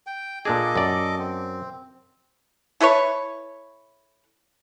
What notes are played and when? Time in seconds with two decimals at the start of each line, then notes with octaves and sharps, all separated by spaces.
0.07 G5
0.45 A#2 D4 G#4 A4 D#5 D6
0.76 F#2 D5
1.18 C4
2.81 E4 A4 B4 C#5